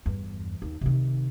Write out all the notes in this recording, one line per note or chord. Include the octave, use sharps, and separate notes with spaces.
E2 G2
D#2
C3 D#3